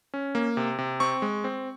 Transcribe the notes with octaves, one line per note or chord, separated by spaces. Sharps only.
C#4
A#3
C3
C3
C4 C#6
G#3
C4